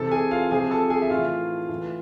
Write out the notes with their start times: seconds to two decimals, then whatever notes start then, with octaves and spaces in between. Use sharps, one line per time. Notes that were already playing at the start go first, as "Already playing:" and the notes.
Already playing: C3 E3 A4 A5
0.11 G#4 G#5
0.31 F4 F5
0.51 C3 F3 G#4 G#5
0.71 A4 A5
0.90 G#4 G#5
1.02 E5
1.10 A2 E3 F4 F5
1.69 A2 E3